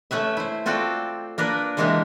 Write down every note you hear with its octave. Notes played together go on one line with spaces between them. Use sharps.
A3 C#4 B4 E5
E4 C5
C4 F4 F#4 A4 D5 G5
A#3 D4 A#4 B4
C3 E3 G#3 A#3 D4 G4